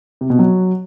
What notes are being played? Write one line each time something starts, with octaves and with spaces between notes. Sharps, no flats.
C3
B2
F#3